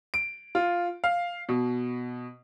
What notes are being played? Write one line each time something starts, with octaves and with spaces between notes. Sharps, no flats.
D7
F4
F5
B2